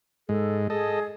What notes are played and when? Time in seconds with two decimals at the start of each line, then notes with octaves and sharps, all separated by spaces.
0.29 G#2 G#3 A4
0.70 G#4 A4 D#5